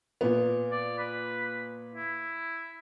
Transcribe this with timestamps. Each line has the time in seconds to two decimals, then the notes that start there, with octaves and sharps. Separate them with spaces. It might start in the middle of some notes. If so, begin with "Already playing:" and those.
0.21 A#2 B3
0.72 D5
0.98 B4
1.95 E4